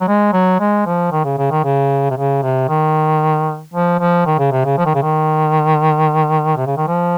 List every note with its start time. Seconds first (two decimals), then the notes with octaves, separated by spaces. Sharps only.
0.01 F#3
0.08 G#3
0.33 F#3
0.60 G#3
0.86 F3
1.12 D#3
1.25 C#3
1.38 C#3
1.51 D#3
1.64 C#3
2.11 C3
2.16 C#3
2.43 C3
2.69 D#3
3.74 F3
3.99 F3
4.26 D#3
4.39 C#3
4.52 C3
4.65 C#3
4.78 F3
4.86 D#3
4.95 C#3
5.02 D#3
6.57 C3
6.66 C#3
6.77 D#3
6.88 F3